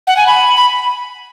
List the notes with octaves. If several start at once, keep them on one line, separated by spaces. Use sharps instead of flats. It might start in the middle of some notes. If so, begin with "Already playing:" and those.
F#5
G#5
B5
B5